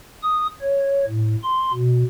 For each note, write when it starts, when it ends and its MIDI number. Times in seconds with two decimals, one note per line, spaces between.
0.23 0.47 87
0.62 1.05 73
1.07 1.35 45
1.43 1.72 84
1.73 2.04 47